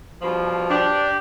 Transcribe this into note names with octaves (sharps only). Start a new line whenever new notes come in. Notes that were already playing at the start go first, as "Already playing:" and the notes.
G2 B2 F3
D4 G4